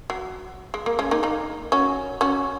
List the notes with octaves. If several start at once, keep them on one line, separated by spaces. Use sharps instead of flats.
F#3
G#3
A#3
G#3 C#4
A#3 D#4
A#3 D#4
C#4 F#4
C#4 F#4